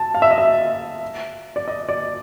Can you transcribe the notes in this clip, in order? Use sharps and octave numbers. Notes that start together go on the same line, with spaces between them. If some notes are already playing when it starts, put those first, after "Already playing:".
Already playing: A5
F5
E5
D#5
E5
D5
D#5
D5